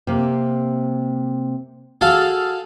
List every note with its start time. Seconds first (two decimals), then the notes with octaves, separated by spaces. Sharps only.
0.07 C3 A#3
2.01 F#4 G#4 A4 F5